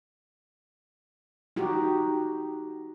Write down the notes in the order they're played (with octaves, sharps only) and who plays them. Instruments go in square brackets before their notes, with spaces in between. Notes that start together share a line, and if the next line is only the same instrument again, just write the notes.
[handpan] D#4 F#4 G4